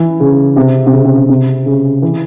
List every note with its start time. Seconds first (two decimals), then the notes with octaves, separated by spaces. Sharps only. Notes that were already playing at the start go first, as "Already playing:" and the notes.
Already playing: E3
0.20 C#3
0.56 C3
0.86 C3
0.93 C#3
1.05 C3
1.17 C3
1.29 C3
1.66 C#3
2.02 E3